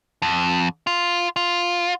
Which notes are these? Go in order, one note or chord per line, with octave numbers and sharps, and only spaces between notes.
F2
F4
F4